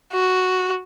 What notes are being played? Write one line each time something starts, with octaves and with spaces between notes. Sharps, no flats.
F#4